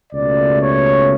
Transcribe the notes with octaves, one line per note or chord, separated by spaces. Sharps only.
C#2 B2 A3 D5
C#5